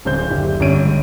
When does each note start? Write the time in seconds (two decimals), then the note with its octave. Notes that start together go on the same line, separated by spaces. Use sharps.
0.05 D1 C#3 C5 G6
0.30 F#1 D3 G4
0.60 G1 C#4 C#5 D7 D#7
0.85 C#2